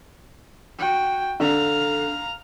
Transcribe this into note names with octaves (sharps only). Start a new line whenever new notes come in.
F#4 G5
D3 F5 A#5